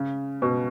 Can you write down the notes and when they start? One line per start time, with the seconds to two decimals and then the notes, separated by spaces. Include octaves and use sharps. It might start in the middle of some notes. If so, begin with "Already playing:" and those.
Already playing: C#3
0.42 B2